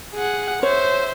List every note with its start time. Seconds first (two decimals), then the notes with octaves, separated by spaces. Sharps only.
0.14 G#4 F#5
0.63 C5 C#5 E5